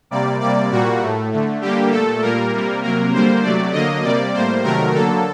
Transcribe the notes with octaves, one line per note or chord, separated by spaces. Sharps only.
C3 G3 A#3 D5
C3 G3 A#3 D5
A#2 G3 A#3 F#4
A2 A3
D3 A3
D3 G3 A#3 G4
A#2 A3 A4
A#2 G3 A#3 A#4
C3 G3 A#3
C3 F#3 A#3 A#4
D3 G3 A#3 C5
C3 F#3 A3 D5
D3 F#3 A#3 D#5
C3 G3 A#3 D5
A2 G3 A#3 C5
C3 D#3 F#3 A3 A#4
D3 F#3 A#3 A4